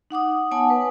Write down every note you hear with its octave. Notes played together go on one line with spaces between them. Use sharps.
D#4 F#5 D6 D#6
B3 C#5 F#5 G#5 A5 D#6
B4